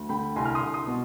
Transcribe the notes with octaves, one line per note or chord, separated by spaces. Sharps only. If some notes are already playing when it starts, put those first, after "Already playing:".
Already playing: D2
D3 G5 B5
C2 G#5 C6
F6
C6 D#6
C2
C6 D#6
B2